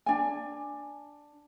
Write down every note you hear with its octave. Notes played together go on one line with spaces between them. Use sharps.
D4 G#5